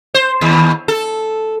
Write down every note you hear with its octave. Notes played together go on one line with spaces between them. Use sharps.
C5
D#2
A4